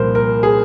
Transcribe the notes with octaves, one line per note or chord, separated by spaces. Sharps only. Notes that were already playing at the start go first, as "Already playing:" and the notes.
Already playing: C2 A#2 F3 A#4 C5
A#4
G#4